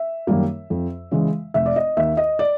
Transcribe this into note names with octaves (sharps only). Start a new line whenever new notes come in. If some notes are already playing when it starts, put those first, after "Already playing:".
Already playing: E5
F#2 D#3 G3 A#3
F2
C#3 E3 G#3
F1 E5
D5
D#5
D#2 D#3 E5
D#5
D5